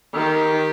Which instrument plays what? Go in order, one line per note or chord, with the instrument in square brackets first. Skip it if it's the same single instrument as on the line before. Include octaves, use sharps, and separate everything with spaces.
[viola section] D#3 [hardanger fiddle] G4